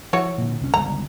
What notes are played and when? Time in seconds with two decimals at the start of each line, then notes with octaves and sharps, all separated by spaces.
0.13 F3 E4 F#4 C#5
0.38 A#2 D3
0.61 C2 C#4
0.74 G1 C#2 A#5